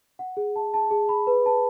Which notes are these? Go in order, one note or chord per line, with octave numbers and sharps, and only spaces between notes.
F#5
G#4
A5
A5
G#4
B5
B4
A5